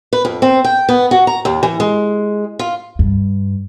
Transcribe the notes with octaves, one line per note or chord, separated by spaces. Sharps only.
B4
F2
C4
G5
B3
F#4
A#5
D#2
E3
G#3
F4
G2